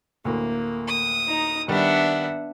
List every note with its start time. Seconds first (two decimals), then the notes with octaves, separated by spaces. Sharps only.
0.25 D2 A2 A#3
0.88 D#6
1.28 D#4 A#5
1.68 D#3 G3 B3 D4 E5 F#5